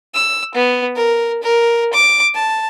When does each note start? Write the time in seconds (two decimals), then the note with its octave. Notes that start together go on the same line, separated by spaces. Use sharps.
0.14 E6
0.54 B3
0.96 A#4
1.43 A#4
1.93 D6
2.34 A5